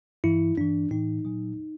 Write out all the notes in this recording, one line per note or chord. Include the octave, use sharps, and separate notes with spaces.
G2 E3 E4
G2 E3 D4
A2 E3 D#4
A#2 F#3